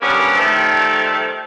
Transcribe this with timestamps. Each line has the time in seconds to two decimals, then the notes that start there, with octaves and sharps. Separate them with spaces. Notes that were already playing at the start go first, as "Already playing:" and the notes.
0.01 D3 G3 A#3 B3 C#4
0.35 D#3 F3 G3 A3